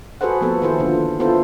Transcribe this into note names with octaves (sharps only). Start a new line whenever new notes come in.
F#4 G#4 A4 B4 C5 F#5
F3 A#3 B3 A4
D#3 E4 A4 C5
D3 F4
B3 E4 F4 A4 C5